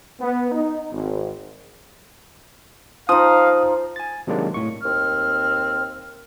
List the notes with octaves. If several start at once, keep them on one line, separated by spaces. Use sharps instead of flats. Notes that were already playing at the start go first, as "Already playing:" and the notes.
B3
D#4
G#1
F3 D#4 F5 D#6
G#5 A6
C3 D#3 F#3 G#3 A#3 D4
A2 C#6
D#2 C4 F6